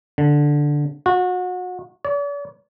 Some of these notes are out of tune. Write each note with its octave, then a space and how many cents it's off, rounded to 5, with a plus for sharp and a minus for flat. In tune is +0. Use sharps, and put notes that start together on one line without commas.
D3 +0
F#4 -30
D5 -45